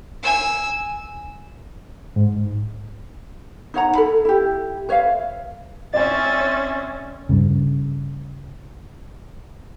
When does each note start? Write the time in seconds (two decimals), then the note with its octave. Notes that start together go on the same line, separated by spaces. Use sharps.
0.23 G#5 E6
2.16 G#2
3.74 D#4 C#5 F#5 A#5
3.95 A4 B5
4.25 E4 G4
4.89 B4 C#5 E5 F5
5.93 C4 C#4 D5 E5 G#5 A6
7.29 G2 C#3